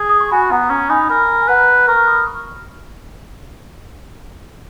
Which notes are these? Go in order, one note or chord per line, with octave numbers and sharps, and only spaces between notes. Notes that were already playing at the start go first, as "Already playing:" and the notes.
Already playing: G#4
D#6
C#6
F#4 G#5 B5
B3 F#5 A#5
C#4 A#5 C#6
D#4 G#5 B5
A#4 G#5 B5
G#5
B4 F#5 A#5
A#4 A#5 C#6
B5 D#6
C#6 F6